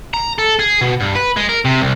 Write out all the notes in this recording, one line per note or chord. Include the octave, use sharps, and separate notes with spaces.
A#5
A4
G#4
B2
G2
B4
G#3
A#4
C3
C2